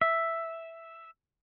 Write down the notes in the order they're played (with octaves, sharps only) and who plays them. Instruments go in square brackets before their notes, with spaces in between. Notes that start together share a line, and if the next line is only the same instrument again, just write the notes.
[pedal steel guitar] E5